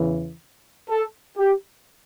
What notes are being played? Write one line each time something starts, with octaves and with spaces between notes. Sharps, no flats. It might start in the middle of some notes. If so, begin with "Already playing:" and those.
Already playing: E2 C#3 E3
A4
G4